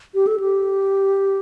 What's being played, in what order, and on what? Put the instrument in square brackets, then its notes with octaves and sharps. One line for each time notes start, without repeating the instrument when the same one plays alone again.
[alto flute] G4
A4
G4